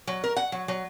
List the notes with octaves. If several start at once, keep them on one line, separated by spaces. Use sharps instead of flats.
F#3
A#4
F#5
F#3
F#3